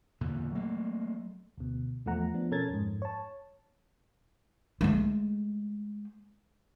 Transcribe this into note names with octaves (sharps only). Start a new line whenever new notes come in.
E2 A#2 D3
F#3 A3 A#3
D2 B2
E2 F3 A3 F#5 A#5
F3 B3 D4
B2 C#4 A4 A#4 G#6 A6
F2 G#2
C#5 A5
G#3 A3